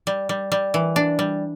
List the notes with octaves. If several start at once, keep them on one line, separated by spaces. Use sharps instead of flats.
G3
G3
G3
E3
D4
G3